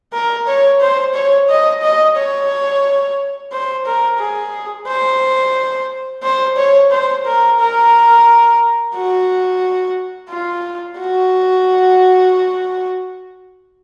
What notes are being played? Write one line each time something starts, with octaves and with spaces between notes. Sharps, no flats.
A#4
C#5
C5
C#5
D#5
D#5
C#5
C5
A#4
G#4
C5
C5
C#5
C5
A#4
A#4
F#4
F4
F#4